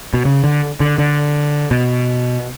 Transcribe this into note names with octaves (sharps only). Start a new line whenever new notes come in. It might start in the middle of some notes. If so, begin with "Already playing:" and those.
B2
C#3
D3
D3
D3
B2